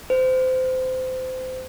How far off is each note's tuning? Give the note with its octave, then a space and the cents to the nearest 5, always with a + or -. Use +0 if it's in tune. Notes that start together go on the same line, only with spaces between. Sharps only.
C5 -25